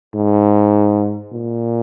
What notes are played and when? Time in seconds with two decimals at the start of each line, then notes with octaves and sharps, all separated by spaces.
0.14 G#2
1.33 A#2